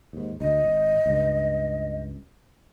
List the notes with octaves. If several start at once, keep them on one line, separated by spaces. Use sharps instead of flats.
D#2 G#2
D2 D#5
G#1
C#2 G2